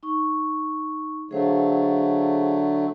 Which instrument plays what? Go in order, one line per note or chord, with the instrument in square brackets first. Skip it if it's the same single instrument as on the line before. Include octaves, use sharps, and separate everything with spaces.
[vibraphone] D#4 C#6
[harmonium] D3 F#3 A3 [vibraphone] G#4 C5 F5